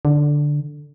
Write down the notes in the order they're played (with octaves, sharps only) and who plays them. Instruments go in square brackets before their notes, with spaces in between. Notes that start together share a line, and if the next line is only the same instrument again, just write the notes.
[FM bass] D3